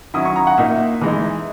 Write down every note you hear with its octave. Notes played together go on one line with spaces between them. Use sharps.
D#3 F#3 C#4 E4 D#6
C#6
A#5
F#5
A#2 A#3 D#4 E5
E3 G#3 D#4